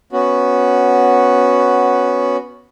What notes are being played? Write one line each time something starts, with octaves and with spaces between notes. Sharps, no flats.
B3 C#4 F#4